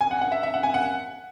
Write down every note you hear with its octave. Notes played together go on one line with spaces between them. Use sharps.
G#5
F#5
F#5
E5
E5
F#5
G#5
F#5